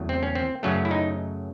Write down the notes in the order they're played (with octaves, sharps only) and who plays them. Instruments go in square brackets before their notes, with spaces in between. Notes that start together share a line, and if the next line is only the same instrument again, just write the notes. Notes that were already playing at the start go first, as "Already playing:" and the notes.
Already playing: [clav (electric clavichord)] E2 C#3 F#3 A3
C4
C#4
C4
F#2 C#3 F#3 A3 C#4
E4
D#4